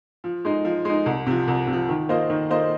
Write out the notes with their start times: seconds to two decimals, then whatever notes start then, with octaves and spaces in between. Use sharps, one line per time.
0.24 F3
0.45 G#3 D#4
0.65 F3
0.85 G#3 D#4
1.06 C2
1.26 C3 F3
1.48 C2
1.67 C3
1.73 F3
1.89 D#3
2.09 A#3 F4 C5 D#5
2.30 D#3
2.50 A#3 F4 C5 D#5